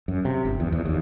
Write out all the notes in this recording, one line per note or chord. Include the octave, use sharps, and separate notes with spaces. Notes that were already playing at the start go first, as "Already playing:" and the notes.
F#2
C3
G1
E2
E2
D#2